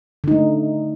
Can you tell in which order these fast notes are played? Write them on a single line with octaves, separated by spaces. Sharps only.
D3 D#4 A3